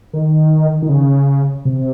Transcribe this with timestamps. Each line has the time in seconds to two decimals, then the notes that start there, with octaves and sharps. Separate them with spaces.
0.13 D#3
0.82 D#3
0.89 C#3
1.65 C3